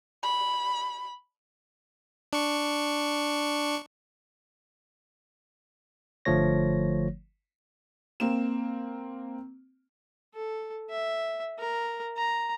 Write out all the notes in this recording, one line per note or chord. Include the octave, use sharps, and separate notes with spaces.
B5
D4 C#6
G1 D3 F3 A3 C#5 A#6
A#3 C4 E7
A4
E5
A#4
A#5